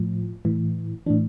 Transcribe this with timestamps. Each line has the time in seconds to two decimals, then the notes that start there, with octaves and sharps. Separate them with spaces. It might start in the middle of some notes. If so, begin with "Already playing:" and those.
Already playing: A2 F3
0.45 A2 E3
1.06 A2 E3 D4